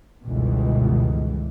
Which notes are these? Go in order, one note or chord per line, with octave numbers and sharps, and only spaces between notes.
G1 C#2 B2 D#3 E3